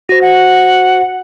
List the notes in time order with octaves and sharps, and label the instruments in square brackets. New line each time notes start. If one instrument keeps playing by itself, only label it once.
[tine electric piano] F#4 C5 [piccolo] A#6
[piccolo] F#5